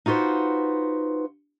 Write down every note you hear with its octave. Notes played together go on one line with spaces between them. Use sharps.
D#4 F4 F#4 B4 C5